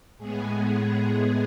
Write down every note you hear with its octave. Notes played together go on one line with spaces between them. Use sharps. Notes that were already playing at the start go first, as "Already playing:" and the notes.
A2 G#3 B3 G#4
G#4